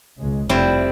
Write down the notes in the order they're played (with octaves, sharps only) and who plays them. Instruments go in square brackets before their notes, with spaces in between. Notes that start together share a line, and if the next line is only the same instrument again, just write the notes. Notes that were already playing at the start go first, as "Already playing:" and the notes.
[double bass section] C#2 G#3
[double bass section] F1 F2 C3 [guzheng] G3 C4 E4